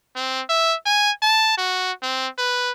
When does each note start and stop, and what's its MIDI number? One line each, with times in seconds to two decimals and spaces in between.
0.16 0.42 60
0.49 0.75 76
0.86 1.10 80
1.22 1.54 81
1.58 1.91 66
2.03 2.27 60
2.38 2.72 71